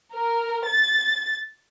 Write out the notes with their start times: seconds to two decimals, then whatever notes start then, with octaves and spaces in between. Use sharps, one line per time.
0.15 A#4
0.68 A6